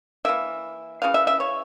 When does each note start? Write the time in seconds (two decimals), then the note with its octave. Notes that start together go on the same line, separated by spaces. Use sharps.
0.25 E3 A#3 E5
1.02 C#3 E3 F5
1.14 E5
1.27 E5
1.40 C#5